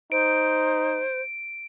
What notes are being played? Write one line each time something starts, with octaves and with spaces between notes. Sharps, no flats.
D#4 C5 D7